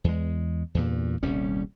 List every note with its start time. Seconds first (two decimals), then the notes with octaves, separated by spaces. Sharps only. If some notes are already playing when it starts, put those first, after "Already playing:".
0.04 E2 G#3
0.75 E2 G2 A#2
1.23 D#1 C2 G3 C#4